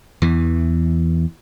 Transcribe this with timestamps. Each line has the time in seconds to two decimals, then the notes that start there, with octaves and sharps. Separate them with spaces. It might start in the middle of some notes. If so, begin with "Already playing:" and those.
0.22 E2 E3